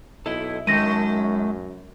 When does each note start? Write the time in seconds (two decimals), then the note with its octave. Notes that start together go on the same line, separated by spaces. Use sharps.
0.26 B1 E4 A4 D#5
0.67 F#2 D#3 G#3 A3 A#6 D#7